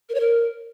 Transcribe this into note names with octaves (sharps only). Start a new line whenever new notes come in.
A#4
C#5
A#4